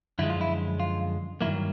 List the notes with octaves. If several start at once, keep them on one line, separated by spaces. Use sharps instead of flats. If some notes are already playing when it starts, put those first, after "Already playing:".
F#2 D3 F3 G#3 E4
F4
E4
F4
G2 D#3 F#3 A#3 E4